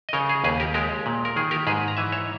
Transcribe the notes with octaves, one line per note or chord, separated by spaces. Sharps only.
D#5
C#3 A#4 C#5
G#4
D#2 G#4 B4
G4 A#4
G#3 G4 A#4
A#2
A#4
D#3 G#4
G4 A#4
G#2 G#4 B4
A#5
E3 E5 G#5
C#5 E5